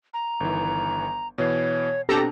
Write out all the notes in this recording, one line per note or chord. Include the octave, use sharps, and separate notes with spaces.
A#5
G1 D#3 E3
B2 E3 C#5 C7
B2 C4 D4 G4 A4 A#5